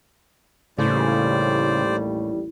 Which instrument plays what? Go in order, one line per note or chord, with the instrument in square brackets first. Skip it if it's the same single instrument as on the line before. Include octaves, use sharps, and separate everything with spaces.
[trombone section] A1 D#2 G3 [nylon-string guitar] A2 [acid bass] C#3 [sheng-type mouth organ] C5 D5